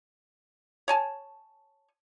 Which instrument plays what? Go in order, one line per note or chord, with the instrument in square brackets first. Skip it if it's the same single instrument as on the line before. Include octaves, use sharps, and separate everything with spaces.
[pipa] C#5 G#5 A5